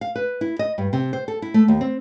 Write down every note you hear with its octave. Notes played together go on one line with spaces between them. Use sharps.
F5
B4
E4
D#5
G2
C3
C5
A4
E4
A3
D#2
C4